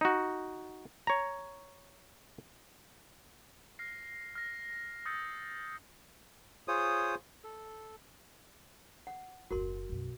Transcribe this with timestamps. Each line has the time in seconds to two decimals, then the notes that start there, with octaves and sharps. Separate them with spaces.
0.01 D#4 F#4
1.07 C#5 A#5
3.79 F6 A#6 C7
4.36 F6 A#6
5.06 D#6 E6 G6 A6 C#7
6.68 F4 G#4 C5 C#5 D#6
7.44 A4
9.07 F#5
9.51 F#1 D#2 F#4 A#4 C6
9.89 B1 F#2